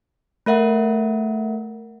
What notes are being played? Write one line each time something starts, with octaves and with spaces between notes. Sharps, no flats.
A3 A#4 E5 F#5